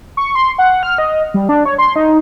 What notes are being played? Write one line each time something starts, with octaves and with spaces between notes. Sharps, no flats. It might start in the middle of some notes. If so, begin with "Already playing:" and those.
C#6
C6
F#5
F6
D#5
G3
D4
C#5
C6
D#4